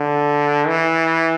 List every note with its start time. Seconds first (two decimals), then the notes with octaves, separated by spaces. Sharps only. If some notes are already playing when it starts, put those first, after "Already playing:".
Already playing: D3
0.67 E3